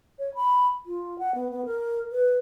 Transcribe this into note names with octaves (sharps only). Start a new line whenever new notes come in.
C#5
B5
F4
F#5
B3
B3
A#4
B4